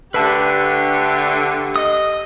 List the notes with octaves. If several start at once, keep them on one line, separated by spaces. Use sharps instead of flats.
D3 A3 G4 B4 A5
D#5 D#6